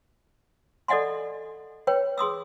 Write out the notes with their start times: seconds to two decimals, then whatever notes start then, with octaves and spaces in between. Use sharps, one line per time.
0.88 A4 D5 D#5 F#5 G#5 C6
1.87 B4 C#5 G5
2.18 G#4 C6 D#6 E6